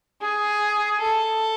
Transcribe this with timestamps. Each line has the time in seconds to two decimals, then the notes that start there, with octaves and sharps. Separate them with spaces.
0.22 G#4
1.01 A4